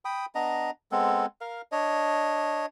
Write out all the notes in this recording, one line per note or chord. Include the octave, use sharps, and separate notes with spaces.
G5 B5 D#6
B3 D4 D#5 A#5
G#3 B3 C4 A4
A#4 F5
D4 C#5 D#5